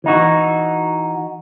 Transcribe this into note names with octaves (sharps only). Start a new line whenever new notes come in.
E3 D#4 F#4